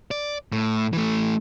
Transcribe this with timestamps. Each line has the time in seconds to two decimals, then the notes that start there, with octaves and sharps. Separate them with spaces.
0.11 D5
0.52 A2
0.93 E3 A3